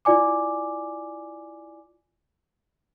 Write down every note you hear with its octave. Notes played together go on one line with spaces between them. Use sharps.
E4 F4 D5 G#5 D6